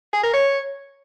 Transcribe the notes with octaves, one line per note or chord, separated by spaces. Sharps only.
G#4
A#4
C#5